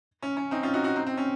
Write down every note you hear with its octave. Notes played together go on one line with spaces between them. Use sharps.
C#4
C#4
C4 D#4
C#4 F4
D#4 F#4
D#4 F#4
C4 D#4
C4
C#4